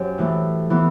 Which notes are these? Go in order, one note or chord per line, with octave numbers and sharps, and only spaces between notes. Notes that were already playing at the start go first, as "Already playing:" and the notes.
Already playing: F#2 C4 G4
A2 E3 A3
E3 B3